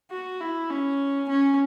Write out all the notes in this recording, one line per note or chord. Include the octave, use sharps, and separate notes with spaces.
F#4
E4
C#4
C#4